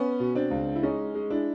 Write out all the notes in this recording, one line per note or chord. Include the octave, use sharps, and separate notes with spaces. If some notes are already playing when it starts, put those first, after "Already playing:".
Already playing: B3 C#4
B2
C4 D4
C#2
E4
G#3 C#4 D#4
G#3
D4 E4